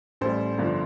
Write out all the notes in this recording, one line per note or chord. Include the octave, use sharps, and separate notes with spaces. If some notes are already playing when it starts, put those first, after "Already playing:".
A1 A2 G3 C5
G1 G2 D3 F3